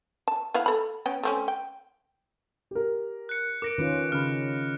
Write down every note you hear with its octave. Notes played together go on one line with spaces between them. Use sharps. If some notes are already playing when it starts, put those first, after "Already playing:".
A5
B3 E4 F5
A4 B5
B3 C#4 G5
A3 C4 C#4
G5
G4 A#4
F#6 C#7
A#4 D6 A#6 D7
D#3 C#4 F4 B4
C#3 B5 F6